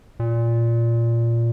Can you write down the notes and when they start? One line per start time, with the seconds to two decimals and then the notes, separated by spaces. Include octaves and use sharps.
0.20 A#2